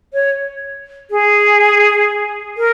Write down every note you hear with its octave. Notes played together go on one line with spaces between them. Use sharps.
C#5
G#4
A#4